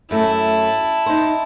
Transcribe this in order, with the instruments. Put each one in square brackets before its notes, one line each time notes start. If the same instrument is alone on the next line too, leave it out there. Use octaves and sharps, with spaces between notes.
[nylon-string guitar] F#2 A3 [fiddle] E4 A5
[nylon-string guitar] D#4 C5